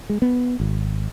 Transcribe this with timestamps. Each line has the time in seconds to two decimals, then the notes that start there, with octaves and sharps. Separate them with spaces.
0.10 G#3
0.22 B3
0.60 G#1